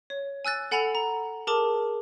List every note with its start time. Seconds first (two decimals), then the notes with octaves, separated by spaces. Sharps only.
0.10 C#5
0.45 G#5 E6 F#6 A6
0.71 A4 F#5 G#5 B5 A6 F7
0.95 A#5
1.47 G#4 A#4 A5 D6